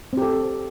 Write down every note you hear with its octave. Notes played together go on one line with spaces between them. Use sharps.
C4 G4 A4